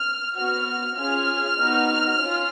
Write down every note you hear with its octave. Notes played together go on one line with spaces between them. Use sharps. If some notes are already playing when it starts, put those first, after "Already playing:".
Already playing: F6
B3 F#4 F6
C#4 F4 G#4 F6
B3 D#4 F#4
C#4 F4